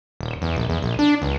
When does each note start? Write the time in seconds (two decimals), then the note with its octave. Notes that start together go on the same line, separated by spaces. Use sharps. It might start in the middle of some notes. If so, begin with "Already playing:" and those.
0.21 D#1
0.42 E2
0.56 A#1
0.69 E2
0.82 A#1
0.99 D4
1.22 C#2